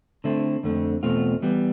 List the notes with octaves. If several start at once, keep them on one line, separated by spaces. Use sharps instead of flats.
D3 A3 C4 E4
F2 D3 A3 C4
E2 B2 A3 C4 F4
E3 G3 B3